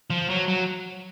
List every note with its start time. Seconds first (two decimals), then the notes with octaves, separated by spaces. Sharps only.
0.10 F3
0.29 F#3
0.48 F#3